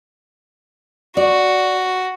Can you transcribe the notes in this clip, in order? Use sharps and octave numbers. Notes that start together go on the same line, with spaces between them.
F#4 D5